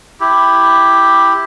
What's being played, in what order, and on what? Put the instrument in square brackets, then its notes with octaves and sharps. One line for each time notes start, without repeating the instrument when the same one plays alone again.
[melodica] E4 G4